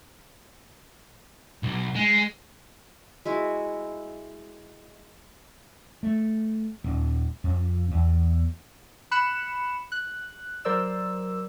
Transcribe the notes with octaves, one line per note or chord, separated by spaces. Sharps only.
B1
G#3
G#3 E4 F#4
A3
D#1
F2
E2
B5 F#6 C#7 E7
F#6
F#3 A#4 C5 D5 E6